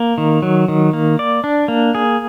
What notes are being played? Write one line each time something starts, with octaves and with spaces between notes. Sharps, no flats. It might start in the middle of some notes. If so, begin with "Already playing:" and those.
Already playing: A#3
D#3
F#3
D#3
A#3
D5
D4
A#3
G#4